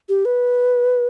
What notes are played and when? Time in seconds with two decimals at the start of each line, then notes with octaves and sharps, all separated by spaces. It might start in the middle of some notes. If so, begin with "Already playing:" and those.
0.09 G4
0.25 B4